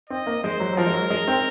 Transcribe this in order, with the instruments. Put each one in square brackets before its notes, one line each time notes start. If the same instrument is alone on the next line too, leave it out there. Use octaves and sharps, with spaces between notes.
[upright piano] C4 [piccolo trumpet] D#5
[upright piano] A#3
[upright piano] G#3 [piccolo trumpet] C5
[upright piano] F#3
F#3
[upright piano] F3 [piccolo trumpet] A#4
[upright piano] G#3
F#3
G#3
C4